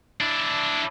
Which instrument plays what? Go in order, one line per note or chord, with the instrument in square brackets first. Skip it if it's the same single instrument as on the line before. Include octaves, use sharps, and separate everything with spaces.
[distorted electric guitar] D4 E4